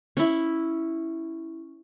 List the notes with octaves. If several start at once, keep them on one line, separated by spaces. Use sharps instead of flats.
C#4 E4